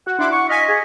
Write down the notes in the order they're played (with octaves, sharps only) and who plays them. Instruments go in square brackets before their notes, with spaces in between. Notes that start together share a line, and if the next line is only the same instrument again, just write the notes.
[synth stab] F#4 [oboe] F#5
[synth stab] D4 E4 D6 [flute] C6
[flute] F#5 [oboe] C#6
[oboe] D#5 [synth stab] F5 G#5 [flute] B6
[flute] G#4